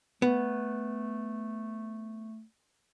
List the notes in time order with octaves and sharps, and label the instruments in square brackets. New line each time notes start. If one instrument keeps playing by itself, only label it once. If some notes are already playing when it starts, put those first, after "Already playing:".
[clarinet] A3 [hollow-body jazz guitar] B3